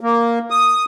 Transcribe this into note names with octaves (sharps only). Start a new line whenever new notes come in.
A#3
D#6